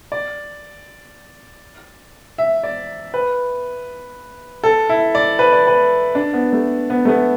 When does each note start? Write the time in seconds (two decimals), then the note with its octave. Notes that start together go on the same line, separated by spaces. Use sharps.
0.12 D5
2.38 E5
2.63 D5
3.14 B4
4.64 A4
4.89 E4
5.15 D5
5.39 B4
5.52 D5
5.67 B4
6.15 D4
6.33 B3
6.53 A3
6.90 B3
7.05 A3
7.09 B3